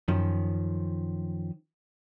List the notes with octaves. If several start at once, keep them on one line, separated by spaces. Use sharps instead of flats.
F#2 D#3 F3 C#4